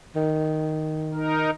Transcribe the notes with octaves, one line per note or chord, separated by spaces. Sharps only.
D#3
D#4 A#4